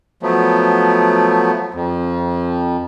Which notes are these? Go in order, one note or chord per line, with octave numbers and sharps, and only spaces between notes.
F3 F#3 A3 B3
F2